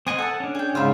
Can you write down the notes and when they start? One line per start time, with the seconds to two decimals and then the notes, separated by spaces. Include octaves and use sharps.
0.07 C4 D#5 F#5 G#5 D#6
0.19 A4 F#5 A5
0.40 C#4 D4
0.55 G#4 G5
0.75 G#2 C#3 F4 E5 B5